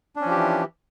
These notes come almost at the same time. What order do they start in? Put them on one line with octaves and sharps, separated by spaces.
D4 C#4 F3 G4 E3